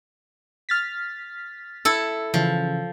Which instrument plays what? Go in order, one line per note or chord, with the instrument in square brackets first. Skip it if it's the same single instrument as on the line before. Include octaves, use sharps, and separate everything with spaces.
[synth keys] F6 A6 B6
[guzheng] E4 A4
[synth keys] C#3 E3 [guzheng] F3